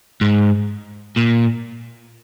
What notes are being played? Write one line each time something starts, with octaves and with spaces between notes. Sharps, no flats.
G#2
A#2